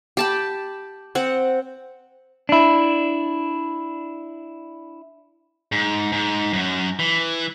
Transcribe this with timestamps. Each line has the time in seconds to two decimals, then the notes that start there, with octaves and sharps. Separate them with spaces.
0.17 G4 A5 B5
1.15 C4 F#5
2.49 D4 E4
5.72 G#2
6.12 G#2
6.53 F#2
6.99 E3